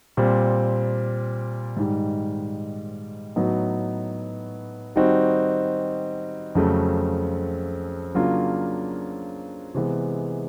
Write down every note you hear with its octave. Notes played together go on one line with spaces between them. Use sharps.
A#2 G3 C4
G#2 D#3 G3
A2 F#3 B3 D#4 F#4
D#3 G3 C4 D#4 F#4
F2 C#3 F#3 A3
C#3 F#3 A#3 D4 F4
C3 E3 G#3 B3